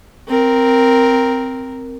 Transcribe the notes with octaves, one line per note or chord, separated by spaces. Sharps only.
C4 A#4